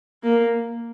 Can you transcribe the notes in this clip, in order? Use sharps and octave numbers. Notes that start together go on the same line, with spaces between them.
A#3